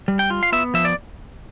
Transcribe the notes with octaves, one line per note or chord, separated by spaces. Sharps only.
G3
G5
F4
F5
B3 E5
F3 E5
D5